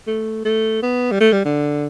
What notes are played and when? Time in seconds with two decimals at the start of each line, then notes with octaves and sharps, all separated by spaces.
0.07 A3
0.45 A3
0.83 B3
1.11 G3
1.20 A3
1.32 G3
1.45 D3